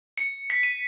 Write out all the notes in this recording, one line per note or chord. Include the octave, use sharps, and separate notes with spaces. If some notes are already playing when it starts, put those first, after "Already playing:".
C#7
B6
D#7